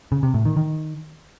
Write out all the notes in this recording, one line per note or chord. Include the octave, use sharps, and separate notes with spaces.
C#3
C3
A2
D#3
D#3